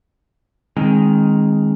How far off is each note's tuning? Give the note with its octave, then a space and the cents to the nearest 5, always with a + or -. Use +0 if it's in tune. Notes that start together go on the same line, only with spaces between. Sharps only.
D#3 +0 G#3 -5 C4 +35